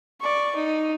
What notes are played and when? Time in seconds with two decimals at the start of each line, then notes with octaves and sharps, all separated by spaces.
0.21 D5 C#6
0.56 D#4